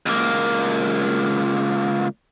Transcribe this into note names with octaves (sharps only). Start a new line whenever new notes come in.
C#2 A#3